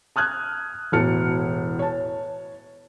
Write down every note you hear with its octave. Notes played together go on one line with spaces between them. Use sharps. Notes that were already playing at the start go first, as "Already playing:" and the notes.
A5 D#6 F6 F#6 G#6
E1 A2 F#4 A5 F6 C#7
C#5 A5